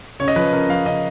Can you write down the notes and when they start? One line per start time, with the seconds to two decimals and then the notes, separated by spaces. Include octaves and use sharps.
0.20 C#3 C#5
0.28 D#5
0.36 F3 B4
0.52 C#3 A#4
0.69 F3 F5
0.85 C#3 D#5